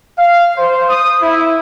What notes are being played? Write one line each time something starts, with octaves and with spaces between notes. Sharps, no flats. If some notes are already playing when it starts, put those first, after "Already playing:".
F5
C5
D#6
E4